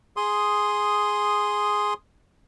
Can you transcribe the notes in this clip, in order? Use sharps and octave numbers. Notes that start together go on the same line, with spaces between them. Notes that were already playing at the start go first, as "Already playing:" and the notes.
G#4 C6 D#6